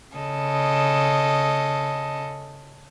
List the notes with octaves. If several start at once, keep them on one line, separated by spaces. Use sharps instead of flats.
C#3 A4 D#5